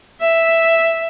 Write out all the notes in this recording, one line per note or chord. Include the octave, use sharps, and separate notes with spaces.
E5